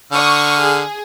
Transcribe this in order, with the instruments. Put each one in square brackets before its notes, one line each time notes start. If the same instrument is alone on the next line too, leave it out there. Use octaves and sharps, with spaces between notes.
[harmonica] D3 F6 [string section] C#6 D#6
[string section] G#4